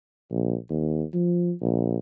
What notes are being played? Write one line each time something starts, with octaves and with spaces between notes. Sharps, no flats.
A#1
D#2
F3
A#1